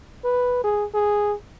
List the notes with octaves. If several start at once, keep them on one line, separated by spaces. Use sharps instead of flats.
B4
G#4
G#4